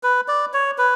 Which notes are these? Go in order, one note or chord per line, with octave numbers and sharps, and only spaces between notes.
B4
D5
C#5
B4